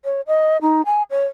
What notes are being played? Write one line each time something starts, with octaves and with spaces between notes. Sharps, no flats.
C#5
D#5
D#4
G#5
C#5